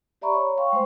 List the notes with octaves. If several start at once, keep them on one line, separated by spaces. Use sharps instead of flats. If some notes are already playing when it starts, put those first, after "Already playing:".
G4 D5 E5 A#5 B5 C#6
C#5
F5 G5 C6 C#6
G#3 A3 C5